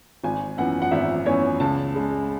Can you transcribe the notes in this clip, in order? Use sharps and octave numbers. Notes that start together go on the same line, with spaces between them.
G#1 G#5
F#2 E3 B3 F#5
F#5
G#1 E5
F#2 E3 B3 C#5
C#2 A5
C#3 G#3